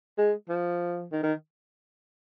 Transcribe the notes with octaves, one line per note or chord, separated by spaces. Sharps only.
G#3
F3
D#3
D#3